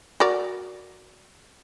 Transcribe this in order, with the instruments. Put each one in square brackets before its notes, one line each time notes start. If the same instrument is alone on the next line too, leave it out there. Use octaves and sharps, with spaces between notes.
[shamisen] F#4 A#4 D5